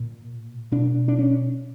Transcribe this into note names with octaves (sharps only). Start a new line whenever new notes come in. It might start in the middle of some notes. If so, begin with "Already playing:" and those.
Already playing: A#2
B2 D4
D4
C#4